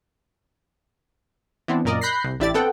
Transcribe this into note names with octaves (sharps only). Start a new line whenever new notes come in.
E3 B3 C4 D4
F#2 A#2 A#4 D5 D#5
B5 F#6 G6 A#6 C7
C2
A1 D4 E4 G4 D5 A6
B3 C4 A4 F#5 G5